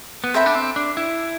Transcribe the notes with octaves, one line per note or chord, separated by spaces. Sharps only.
B3
C4 A4 E5 G5 B5
D4
C4
D4
E4